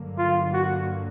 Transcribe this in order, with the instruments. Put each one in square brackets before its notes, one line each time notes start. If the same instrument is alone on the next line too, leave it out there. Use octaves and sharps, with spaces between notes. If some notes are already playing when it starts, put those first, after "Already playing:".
Already playing: [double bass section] G2 D3 F#3 A#3
[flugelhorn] F4
F#4